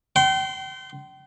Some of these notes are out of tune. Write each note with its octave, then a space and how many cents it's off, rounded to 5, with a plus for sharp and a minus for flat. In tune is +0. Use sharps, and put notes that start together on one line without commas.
G5 -40 C6 -15